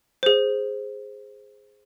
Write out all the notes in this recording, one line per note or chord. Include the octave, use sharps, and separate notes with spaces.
G#4 C5